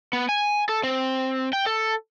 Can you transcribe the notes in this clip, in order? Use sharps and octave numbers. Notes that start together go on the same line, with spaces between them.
B3
G#5
A4
C4
G5
A4